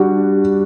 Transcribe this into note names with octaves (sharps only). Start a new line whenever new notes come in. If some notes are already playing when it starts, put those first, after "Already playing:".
Already playing: G3 D4 F#4